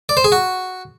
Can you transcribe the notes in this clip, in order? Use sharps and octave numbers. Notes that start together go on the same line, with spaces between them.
D5
C5
G#4
F#4